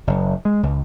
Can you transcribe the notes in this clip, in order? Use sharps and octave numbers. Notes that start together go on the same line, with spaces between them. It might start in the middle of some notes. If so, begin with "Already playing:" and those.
F#1
G#3
C#2